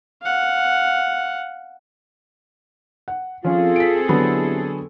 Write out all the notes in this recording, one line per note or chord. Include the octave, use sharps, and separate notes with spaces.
F5 F#5
F#5
F3 C4 C#4 F4 G#4 A4
B6 D7
D3 F#3 B3 E4 G4